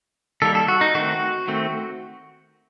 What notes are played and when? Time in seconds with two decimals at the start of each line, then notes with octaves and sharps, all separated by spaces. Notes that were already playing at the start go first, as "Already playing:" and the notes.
0.42 D#3 G3 A#3 A4
0.55 A4
0.68 F#4
0.81 D#4
0.95 D#3 A3 C4 F#4
1.48 D#3 A3 C4